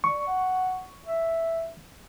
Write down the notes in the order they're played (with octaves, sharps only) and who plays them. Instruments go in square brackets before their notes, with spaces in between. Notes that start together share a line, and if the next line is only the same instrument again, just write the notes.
[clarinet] D5 [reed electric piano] C#6
[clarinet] F#5
E5